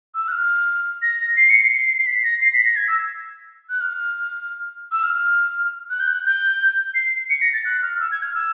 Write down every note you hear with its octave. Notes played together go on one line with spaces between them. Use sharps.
E6
F#6
F6
A#6
C7
C#7
C7
C7
B6
A#6
C7
B6
A#6
G#6
E6
F#6
F6
E6
F6
F#6
G6
F#6
G6
C7
C#7
A#6
A6
F#6
F6
E6
G#6
F6
E6